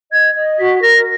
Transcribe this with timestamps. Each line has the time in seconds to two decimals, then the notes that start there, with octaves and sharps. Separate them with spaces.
0.12 D#5 G#6
0.36 D#5
0.59 F#4 B6
0.82 A#4 A#6